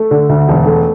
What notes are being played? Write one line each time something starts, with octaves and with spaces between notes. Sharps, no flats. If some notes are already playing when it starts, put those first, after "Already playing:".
Already playing: A3
D3
D2
E1
A3